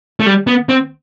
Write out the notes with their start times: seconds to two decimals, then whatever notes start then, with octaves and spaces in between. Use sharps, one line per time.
0.20 A3
0.26 G3
0.47 B3
0.69 C4